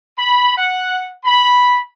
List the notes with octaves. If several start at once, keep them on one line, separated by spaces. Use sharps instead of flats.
B5
F#5
B5